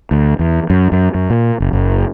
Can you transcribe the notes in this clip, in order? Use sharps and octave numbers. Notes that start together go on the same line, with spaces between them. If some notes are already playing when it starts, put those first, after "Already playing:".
D2
E2
F#2
F#2
F#2
A#2
F#1
F#1